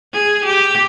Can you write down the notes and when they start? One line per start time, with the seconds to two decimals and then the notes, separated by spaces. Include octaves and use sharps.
0.13 G#4
0.45 G4